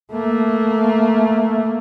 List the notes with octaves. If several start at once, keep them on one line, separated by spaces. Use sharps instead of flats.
A3 A#3